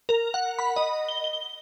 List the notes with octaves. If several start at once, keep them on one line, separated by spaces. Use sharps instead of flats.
A#4
F#5
B5
D#5
G7
G7